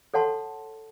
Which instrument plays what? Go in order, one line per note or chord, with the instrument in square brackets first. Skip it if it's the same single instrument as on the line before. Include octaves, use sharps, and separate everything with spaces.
[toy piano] A4 C#5 F#5 A5 C6